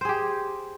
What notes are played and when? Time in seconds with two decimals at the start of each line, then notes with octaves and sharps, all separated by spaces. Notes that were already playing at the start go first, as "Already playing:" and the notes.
0.01 C5
0.05 G#4
0.09 G4